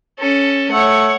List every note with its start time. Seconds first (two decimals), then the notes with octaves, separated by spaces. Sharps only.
0.19 C#4 A4
0.72 A3 C#5 F#5